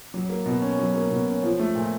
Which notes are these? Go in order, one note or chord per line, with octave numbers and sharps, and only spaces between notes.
F#3
A#3
B2
C#4
F#3
A#3
B2
C#4
F3
A3
A#2